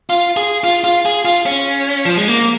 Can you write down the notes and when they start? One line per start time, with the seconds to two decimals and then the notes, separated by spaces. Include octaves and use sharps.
0.10 F4
0.37 G#4
0.64 F4
0.84 F4
1.05 G#4
1.25 F4
1.46 C#4
2.05 F3
2.17 G#3
2.28 A#3